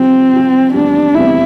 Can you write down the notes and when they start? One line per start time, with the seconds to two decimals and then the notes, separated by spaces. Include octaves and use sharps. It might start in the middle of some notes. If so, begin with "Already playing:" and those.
Already playing: C2 C3 F3 C4
0.32 C2 C3 F3
0.73 F1 E2 C3 G3 D4
1.15 F1 E2 C3 G3 E4